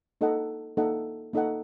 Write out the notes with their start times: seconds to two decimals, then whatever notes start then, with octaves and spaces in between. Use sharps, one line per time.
0.21 A#3 D#4 A4 D#5 F#5
0.77 A#3 D#4 A4 D#5 F#5
1.33 A#3 D#4 A4 D#5 F#5